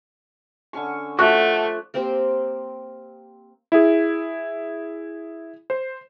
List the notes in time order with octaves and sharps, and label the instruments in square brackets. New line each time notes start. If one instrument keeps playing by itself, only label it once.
[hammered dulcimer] D3 C#4 C#6
[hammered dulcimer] F3 C#5 D5 [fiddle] A3 [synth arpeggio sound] F#4 [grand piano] F#5 F#6
[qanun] A#3 C4 G4 C5
[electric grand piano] E4 G#4
C5